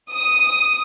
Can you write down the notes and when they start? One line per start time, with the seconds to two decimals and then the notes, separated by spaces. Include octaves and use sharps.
0.12 D#6